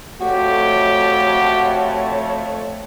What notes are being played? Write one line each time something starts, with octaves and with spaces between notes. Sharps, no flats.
F2 A3 F#4 G4 C#5